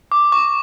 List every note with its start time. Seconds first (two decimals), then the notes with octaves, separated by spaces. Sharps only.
0.12 D6
0.32 C#6